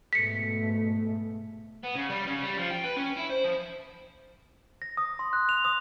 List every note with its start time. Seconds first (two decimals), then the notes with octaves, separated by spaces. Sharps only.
0.13 G#2 B2 A3 B6 C#7
1.83 B3
1.95 C#3
2.10 G3
2.27 C#3
2.43 G3
2.58 F3
2.71 G5
2.84 B4
2.96 C#4
3.16 E4
3.30 C5
3.44 F3
4.82 A#6
4.97 D#6
5.19 C6
5.33 F#6
5.49 F7
5.65 D#6